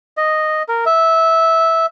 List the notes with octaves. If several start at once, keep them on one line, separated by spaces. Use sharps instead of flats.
D#5
A#4
E5